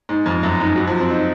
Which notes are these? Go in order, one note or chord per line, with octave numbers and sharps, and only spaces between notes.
G#2
F2
F#2
G#2
F#3
F3
C4
D#4